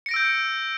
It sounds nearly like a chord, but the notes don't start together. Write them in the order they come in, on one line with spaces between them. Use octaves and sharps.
C#7 A#6 D7 E6 G6